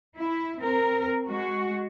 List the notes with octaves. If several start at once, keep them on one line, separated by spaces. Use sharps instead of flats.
E4
C4 A#4
G#3 F#4